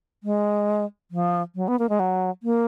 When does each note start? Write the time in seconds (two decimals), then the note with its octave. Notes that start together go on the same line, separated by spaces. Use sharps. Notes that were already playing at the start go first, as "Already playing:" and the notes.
0.24 G#3
1.11 F3
1.55 F#3
1.68 B3
1.79 A#3
1.89 G#3
2.00 F#3
2.43 A#3